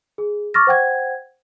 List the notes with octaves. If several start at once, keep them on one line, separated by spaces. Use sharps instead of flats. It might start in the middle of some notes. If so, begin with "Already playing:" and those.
G#4
C#6 D6 F6 A6 A#6
C5 F#5 G5 G#6